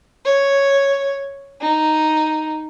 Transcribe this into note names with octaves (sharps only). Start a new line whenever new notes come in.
C#5
D#4